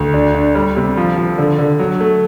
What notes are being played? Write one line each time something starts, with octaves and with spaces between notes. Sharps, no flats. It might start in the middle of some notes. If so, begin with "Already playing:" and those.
Already playing: D2
D4
D4
G3
C3
F3
F3
D3
D3
F#3
A3